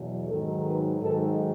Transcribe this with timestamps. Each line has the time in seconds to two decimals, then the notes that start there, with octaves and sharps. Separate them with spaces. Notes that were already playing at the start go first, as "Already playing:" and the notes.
Already playing: E2 B2 F#3
0.29 G#2 D#3 F#3 A4
0.65 B4
1.01 G#2 D#3 F#3 A4